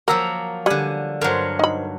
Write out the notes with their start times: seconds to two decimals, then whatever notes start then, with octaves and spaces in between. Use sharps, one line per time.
0.08 F3 F#3 A#3 A#4 A#5 E6
0.66 D3 G3 G#5 F#6
1.21 G2 F#3 A#4 C5
1.59 D#4 B5